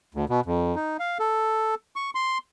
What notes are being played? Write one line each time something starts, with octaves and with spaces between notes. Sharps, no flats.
D2
B2
F2
D#4
F5
A4
C#6
C6